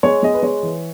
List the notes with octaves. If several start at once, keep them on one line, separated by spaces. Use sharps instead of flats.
G#3 C#5
G#3 D#5
B4
G#3 C#5
E3